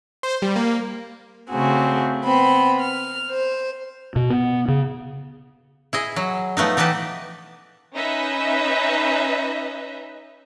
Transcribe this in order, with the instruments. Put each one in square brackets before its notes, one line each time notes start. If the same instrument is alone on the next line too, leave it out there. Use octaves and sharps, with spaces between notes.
[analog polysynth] C5
G3
A#3
[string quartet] C#3 A3 C4 F#4 G#4
B3 C4 B5
F6
C5
[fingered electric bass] B2
B3
C#3
[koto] E4 G#4 D#5
F#3
F3 A3 B3 D#4
E3 D#4 G4 B4 A5
[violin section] C#4 D#4 B4 D#5 E5